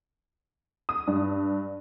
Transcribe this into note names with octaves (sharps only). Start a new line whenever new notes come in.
D#6
G2